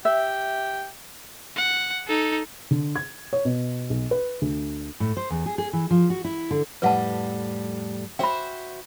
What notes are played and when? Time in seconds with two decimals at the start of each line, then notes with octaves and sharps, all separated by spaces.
0.05 G4 E5
1.56 F#5
2.07 D#4 A4
2.71 D3
2.96 G#6
3.33 C#5
3.45 B2
3.90 B1
4.11 B4
4.41 D2
5.00 A2
5.17 C5
5.30 E2
5.46 G#4
5.58 G#4
5.73 E3
5.90 F3
6.10 F#4
6.24 E4
6.51 D3
6.82 F2 A2 G3 B4 F#5 A5
8.19 F#4 C5 E5 G5 B5